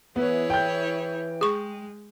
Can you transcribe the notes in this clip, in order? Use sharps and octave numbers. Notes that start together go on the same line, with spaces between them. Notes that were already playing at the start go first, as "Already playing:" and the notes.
E3 B3 E4 G#4 C#5
G5 G6
G#3 G#4 C#6